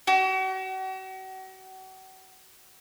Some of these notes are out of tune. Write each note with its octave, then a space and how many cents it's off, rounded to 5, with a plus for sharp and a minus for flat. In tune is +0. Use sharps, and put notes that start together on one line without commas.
F#4 +40